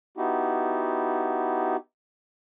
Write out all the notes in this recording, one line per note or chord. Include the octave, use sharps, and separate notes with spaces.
B3 D#4 E4 F#4 G4